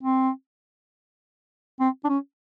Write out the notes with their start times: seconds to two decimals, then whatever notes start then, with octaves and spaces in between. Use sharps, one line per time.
0.03 C4
1.80 C4
2.04 D4
2.09 C#4